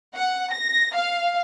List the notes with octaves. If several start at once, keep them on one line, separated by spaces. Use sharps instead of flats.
F#5
A#6
F5